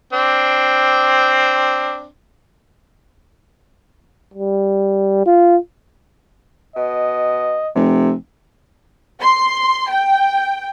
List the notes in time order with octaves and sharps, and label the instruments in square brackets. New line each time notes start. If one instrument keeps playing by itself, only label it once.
[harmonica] C4 D4
[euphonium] G3
F4
[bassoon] B2 [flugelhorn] D#5
[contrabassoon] F1 [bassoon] C3
[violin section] C6
G5